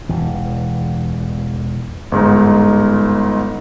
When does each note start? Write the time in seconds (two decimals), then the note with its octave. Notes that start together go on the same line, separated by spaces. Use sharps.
0.09 E1 E3
2.12 G1 G#2 D#4